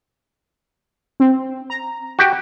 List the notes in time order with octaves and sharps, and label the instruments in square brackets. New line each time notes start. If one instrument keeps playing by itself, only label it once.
[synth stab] C4
A#5
[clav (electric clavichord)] F#4 G4 G5